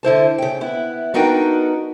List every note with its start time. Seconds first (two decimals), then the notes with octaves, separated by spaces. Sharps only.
0.03 D3 E4 C5 A5
0.38 C#3 G5
0.61 B3 E4
1.14 B3 D4 D#4 F#4 A#4 G5